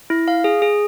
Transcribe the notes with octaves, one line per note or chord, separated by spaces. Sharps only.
E4
F5
G#4
G#4